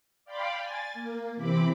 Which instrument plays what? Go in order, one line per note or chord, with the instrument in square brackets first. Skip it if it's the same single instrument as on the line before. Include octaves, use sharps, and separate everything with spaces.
[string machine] D5 F5 G5 B5 C6 D6
G#5 A6
A#3
C3 E3 C4 B5 D6